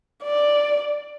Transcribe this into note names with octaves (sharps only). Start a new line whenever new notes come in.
D5